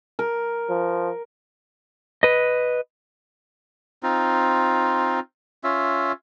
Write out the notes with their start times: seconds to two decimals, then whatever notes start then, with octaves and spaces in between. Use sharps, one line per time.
0.19 A#4
0.69 F3
2.23 B4 D#5
4.03 C4 D#4 F4
5.64 C#4 F4 E5